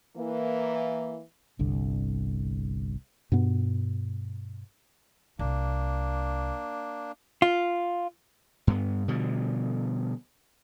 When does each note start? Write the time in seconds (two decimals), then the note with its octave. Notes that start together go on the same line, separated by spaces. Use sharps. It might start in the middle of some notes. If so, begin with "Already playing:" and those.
0.17 E3 A#3
1.59 G1 C2 D3
3.32 G2 B2 B3
5.39 C2 A#3 D4
7.42 F4
8.67 G2 B3
9.08 B2 D3 F3 G3